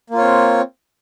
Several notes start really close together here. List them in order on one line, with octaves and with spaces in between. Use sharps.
A#3 F4 C#5 C4